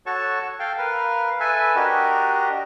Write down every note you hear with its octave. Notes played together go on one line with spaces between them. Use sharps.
F#4 A4 C#5 A5 C#6
A4 F5 G5
A#4 B4 F5
A4 B4 E5 G#5
D4 F#4 G4 A#4 D#5